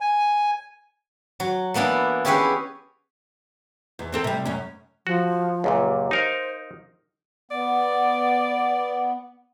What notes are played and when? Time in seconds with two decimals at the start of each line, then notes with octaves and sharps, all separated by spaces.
0.01 G#5
1.40 F#3
1.74 E3 A#3 B3 D4 E4
2.25 C#4 E4 G4 G#4 B4 C#5
3.99 E2
4.12 A#3 C4 A4
4.24 C3 G3
4.45 F#2 C#4
5.07 F3 F#4
5.64 C#2 F#2 A#2
5.82 G4
6.11 D#4 A#4 C5 F5
7.51 B3 D5